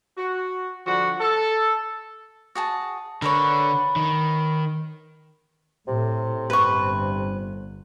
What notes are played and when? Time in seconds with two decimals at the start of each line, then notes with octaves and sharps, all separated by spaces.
0.17 F#4
0.86 D3 F3 G3 F#4
1.20 A4
2.55 F#4 G#4 A5
3.22 D3 A#4 B4 C#5
3.96 D#3
5.88 A2 C3
6.50 G1 B4 C#6